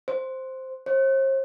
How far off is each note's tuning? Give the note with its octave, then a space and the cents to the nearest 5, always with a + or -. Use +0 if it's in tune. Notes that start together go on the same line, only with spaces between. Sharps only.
C5 +0
C5 +45